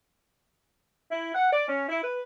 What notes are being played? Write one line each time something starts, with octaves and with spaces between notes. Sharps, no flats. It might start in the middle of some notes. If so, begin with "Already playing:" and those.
E4
F#5
D5
C#4
E4
B4